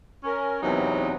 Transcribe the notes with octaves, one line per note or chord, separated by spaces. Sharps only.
C#4 A#4
E2 C3 F#3 B3 C4 D#4